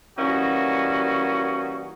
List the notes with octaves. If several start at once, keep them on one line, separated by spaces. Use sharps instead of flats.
E3 G3 A#3 C#4 D#4 F#4